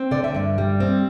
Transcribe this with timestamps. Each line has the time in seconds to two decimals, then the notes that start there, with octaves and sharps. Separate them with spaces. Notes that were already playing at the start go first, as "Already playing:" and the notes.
Already playing: C4
0.11 D3 D5
0.24 E5
0.34 G2 D5
0.58 G3
0.80 C4